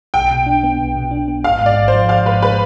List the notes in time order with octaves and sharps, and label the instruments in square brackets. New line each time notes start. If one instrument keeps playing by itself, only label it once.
[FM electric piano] B1 [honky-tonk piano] G5
[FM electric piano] B2
D4
B3
B1
B2
D4
B3
[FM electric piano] G#1 [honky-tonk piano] F5
[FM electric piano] G#2 [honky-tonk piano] D5
[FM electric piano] G#1
[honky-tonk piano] C5
[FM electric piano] F3
[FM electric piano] G#1 [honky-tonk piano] F5
[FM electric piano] G#2 [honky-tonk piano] B4
[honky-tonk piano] B4